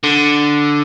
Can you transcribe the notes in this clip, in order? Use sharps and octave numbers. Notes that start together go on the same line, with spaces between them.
D3